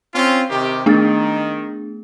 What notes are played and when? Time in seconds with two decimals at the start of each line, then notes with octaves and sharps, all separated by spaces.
0.14 C4 C#4 F4
0.50 C3 D#3 G4
0.86 D#3 A3 B3 D4 G#4 A6